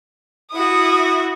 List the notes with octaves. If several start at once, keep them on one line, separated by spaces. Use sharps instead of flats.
E4 F#4 D#6